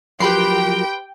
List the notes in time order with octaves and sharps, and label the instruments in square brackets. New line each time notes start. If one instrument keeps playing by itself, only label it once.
[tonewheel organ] F3 F#3 A#4 [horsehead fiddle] G4 [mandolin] B4 B5 C6 [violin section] G5